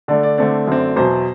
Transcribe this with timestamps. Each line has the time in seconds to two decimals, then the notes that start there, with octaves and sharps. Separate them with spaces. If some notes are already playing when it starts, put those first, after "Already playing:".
0.08 D3 A3 D4 D5
0.23 D5
0.38 D3 A3 C4 D5
0.67 F#2 D3 A3 C4
0.96 E2 B2 F#3 C5